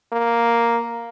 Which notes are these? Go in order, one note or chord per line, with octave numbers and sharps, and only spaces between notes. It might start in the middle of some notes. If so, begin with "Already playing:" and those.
A#3